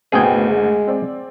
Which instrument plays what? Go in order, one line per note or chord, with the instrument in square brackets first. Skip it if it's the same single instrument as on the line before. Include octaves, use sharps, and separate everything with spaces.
[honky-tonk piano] F#1 D2 [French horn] B2 [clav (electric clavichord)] G#4 G5
[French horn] G#3
[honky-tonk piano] C4 D5